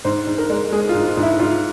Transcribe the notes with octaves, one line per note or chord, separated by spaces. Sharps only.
G#2 C5
G#2
A#4
G#3
G#3 G#4
F4
G#2
F4
G#2
E4
G#2 F4